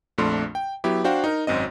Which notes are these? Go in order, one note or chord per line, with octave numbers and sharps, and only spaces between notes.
A#1 F2 A3 D4 C6
G5
F#3 B3 E4 G4
D4 F#4 C5 F5 G5
D#4 A#4
G#1 F#2 C4 D#5